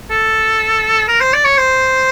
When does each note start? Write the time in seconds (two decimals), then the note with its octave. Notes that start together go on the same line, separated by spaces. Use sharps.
0.10 A4
1.08 A#4
1.21 C5
1.33 D5
1.45 C#5
1.57 C5